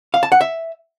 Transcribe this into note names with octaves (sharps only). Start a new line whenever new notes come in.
F5
A5
F#5
E5